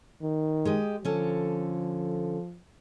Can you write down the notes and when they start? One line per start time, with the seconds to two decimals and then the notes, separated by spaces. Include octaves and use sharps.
0.22 D#3
0.65 G#3 G4 D#5
1.05 D3 F3 C#4 A4